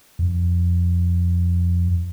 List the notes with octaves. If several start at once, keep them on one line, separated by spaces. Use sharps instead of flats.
F2